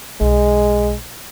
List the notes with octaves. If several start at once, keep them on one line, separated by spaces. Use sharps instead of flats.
B1 G#3